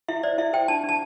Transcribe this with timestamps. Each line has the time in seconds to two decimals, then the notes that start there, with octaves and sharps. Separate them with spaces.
0.08 E4 E5
0.23 C5 D5
0.38 E4 E5
0.53 C5 G5
0.68 D4 A5
0.84 D4 A5